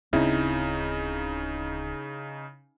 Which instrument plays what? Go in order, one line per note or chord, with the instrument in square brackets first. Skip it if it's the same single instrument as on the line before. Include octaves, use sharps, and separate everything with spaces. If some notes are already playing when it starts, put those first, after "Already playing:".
[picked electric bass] D1 C4 [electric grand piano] C#3 D#4 [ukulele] E4